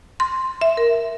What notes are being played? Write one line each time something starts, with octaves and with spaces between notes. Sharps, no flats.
C6
E5
A#4